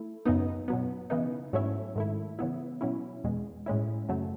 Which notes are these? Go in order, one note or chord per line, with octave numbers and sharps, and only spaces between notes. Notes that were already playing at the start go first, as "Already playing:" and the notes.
Already playing: A3 E4
F#2 C#3 F#3 B3 D#4
B2 F#3 B3
C#3 E3 B3 D#4
G#2 F#3 A3 C#4 E4
G#2 D#3 A3 E4
C#3 E3 B3 E4
B2 F#3 C#4 E4
E2 B2 G#3
A2 G#3 C#4 E4
F#2 C#3 F#3 A3